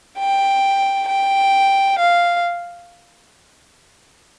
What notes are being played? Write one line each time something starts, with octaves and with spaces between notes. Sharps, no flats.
G5
G5
F5